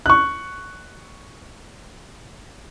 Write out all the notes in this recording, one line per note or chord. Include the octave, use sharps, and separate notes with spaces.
C#6 F#6